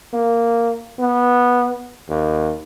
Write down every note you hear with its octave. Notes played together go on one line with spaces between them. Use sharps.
A#3
B3
D#2